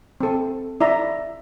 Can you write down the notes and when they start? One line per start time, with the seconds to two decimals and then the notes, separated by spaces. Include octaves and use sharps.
0.21 C4 A4
0.81 E4 D5 E5 A#5